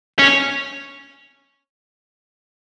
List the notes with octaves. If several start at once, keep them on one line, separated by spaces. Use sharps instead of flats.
C#4